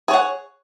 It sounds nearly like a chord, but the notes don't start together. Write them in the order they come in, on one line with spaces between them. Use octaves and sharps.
G#4 C#5 F#5